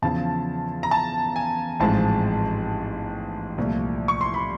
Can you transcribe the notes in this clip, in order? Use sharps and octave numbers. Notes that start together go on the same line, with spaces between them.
E2 C#3 F3 A5
A#5
A5
G#5
A1 G#2 F3 G#3 C4 A5
C2 A#2 F3 A3
C#6
C6
B5